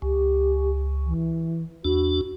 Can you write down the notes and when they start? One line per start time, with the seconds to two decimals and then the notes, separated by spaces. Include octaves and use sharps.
0.02 C#2 G4
1.06 E3
1.85 E2 D4 F#4